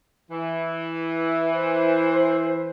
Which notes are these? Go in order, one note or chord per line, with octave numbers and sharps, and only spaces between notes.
E3
C5